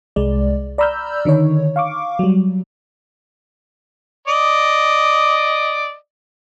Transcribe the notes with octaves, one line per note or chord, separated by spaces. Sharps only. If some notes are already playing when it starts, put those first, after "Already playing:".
C2 G#3 D5
D5 A#5 B5 E6 F6 G6
D3 D#3 D#4 C#5
F5 C#6 D6
F#3 G3
D5 D#5